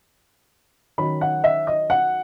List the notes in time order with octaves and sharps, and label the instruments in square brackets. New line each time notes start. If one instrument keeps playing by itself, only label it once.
[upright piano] D#3 F#3 C#4 B5
F#5
E5
D#5
F#5